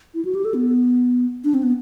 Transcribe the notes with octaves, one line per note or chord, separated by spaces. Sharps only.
E4
F#4
G4
A4
B3
D4
C4
B3